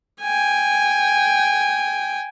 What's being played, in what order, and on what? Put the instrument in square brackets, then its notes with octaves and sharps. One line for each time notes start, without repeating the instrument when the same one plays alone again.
[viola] G5 G#5